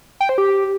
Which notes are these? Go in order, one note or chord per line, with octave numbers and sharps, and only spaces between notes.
G5
C5
G4